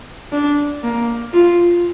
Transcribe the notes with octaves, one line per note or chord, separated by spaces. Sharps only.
D4
A#3
F4